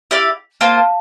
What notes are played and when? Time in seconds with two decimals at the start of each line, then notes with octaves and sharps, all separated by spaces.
0.11 E4 G4 D5 F5
0.61 A#3 F4 C5 F5 A5
0.77 F5 A5